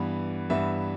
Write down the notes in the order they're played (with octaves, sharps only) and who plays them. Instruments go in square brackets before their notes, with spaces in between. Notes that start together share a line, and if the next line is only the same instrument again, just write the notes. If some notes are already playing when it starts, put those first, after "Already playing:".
Already playing: [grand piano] G2 E3 B3
G2 E3 B3 E5